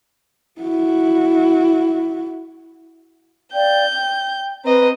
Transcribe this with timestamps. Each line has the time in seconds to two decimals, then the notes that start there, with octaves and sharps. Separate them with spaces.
0.61 E4 F#4
3.54 D5 F5 G5 G6
3.94 G5
4.65 C4 B4 D#5 A#5